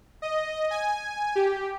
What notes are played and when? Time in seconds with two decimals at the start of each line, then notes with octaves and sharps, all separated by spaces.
0.22 D#5
0.71 G#5
1.35 G4